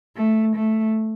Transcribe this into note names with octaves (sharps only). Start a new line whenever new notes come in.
A3
A3